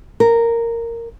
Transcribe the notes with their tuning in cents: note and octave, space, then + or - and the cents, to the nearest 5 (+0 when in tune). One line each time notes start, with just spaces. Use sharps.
A#4 -10